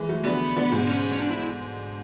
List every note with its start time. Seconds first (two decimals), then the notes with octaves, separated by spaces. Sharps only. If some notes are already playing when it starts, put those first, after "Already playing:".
Already playing: E3 G#3
0.09 F#3 A3
0.24 D3 F#3 B3
0.56 B2 D3
0.72 G#2 B2
0.88 C#4
1.13 C#4
1.20 D4
1.30 E4